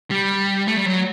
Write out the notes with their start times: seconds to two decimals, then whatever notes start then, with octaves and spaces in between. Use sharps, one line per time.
0.11 G3
0.68 A3
0.78 G3
0.87 F#3